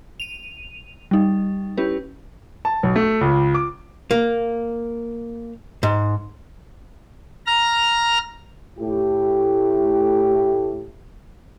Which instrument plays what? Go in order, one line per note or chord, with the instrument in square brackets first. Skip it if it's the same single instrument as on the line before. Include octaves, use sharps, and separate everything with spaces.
[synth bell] D#7 F7
G3 D#4
C#4 E4 G4 B4
[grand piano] A5
B1
A3
C#2
D6
[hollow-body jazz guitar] A#3
G#2
[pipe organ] A#5 F6
[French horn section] A2 A3 E4 G4